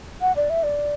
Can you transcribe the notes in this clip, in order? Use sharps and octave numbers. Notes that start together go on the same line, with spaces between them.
F#5
D5
E5
D5